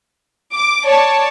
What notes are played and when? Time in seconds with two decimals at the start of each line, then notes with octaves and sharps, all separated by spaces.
0.53 D6
0.86 C#5 D5 A5